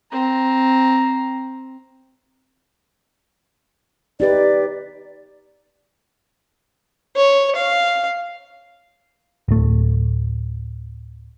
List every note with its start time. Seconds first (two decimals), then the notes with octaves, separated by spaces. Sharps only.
0.12 C4 A#5
4.20 D#4 G4 B4 D5
7.16 C#5
7.56 F5
9.48 D1 A3